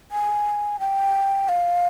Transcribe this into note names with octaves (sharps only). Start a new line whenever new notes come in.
G#5
G5
F5